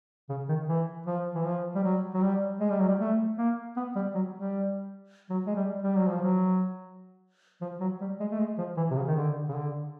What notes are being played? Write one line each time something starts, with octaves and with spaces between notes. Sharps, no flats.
C#3
D#3
E3
F3
E3
F3
G3
F#3
F#3
G3
G#3
G3
F#3
G3
A3
A#3
B3
G3
F#3
G3
F#3
G#3
G3
G3
F#3
F3
F#3
F3
F#3
G3
G#3
A3
G#3
F3
E3
C3
C#3
D#3
D3
C#3
D3